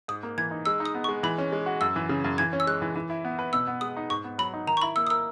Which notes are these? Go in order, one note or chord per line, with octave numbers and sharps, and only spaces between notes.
G#2 D#6
A#3
E3 G#6
D#4
G#3 E6
D#4
D#6
B3
C#6
G#3
E3 B5
C#4
G#3
F#4
F#2 E6
E3
C#3
F#2
E3 G#6
C#4
E6
G#3 F#6
E3
E3
E4
B3
B4
B2 E6
B3
G#3 D#6
D#4
G#2 C#6
B3
F#3 B5
D#4
D#3 A#5
C#6
E4 B5
A#3 E6
D#6
A#4 E6